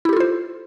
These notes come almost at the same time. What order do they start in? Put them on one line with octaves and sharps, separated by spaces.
E4 G4 A4 F4 C5